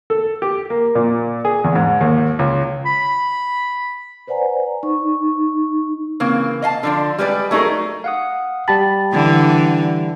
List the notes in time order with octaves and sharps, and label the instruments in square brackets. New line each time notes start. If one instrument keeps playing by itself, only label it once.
[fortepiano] A4
G4
A#3
A#2
G#4
E2
G#2
D#2
C#2
[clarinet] B5
[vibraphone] B4 C5 D5 F#5 G#5 A#5
D#4 C#6
[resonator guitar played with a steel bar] C#3 E3 A#3 C4
D#5 F5 G#5 A5
D3 F3 D4
G3 G#3 B4 D5
F#3 A3 D#4 G#4 A#4
[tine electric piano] F5 F#5 D#6
[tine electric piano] G3 G4 B5 [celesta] G5 A5 A6
[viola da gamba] D3 E3